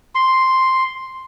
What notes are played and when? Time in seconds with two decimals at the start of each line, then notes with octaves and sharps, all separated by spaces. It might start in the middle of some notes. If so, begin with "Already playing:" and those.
0.15 C6